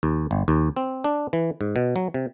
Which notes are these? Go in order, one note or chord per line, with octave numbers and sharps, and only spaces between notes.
D#2
G1
D#2
C4
D4
E3
G#2
B2
F#3
C3